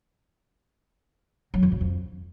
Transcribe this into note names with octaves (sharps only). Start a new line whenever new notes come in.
F#3
E2
F#2
F2